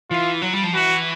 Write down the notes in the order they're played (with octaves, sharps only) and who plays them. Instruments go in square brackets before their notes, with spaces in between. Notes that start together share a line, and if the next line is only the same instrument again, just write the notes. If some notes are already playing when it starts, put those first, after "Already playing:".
[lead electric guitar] E3 [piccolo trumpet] F4
[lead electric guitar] F#3
G3
F3
[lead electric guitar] E3 [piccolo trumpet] F#4